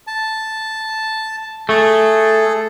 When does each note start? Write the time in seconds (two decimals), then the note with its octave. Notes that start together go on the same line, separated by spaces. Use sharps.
0.07 A5
1.69 A3 G#4 A4